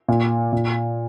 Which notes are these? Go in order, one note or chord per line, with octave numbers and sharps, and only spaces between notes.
A#2
A#2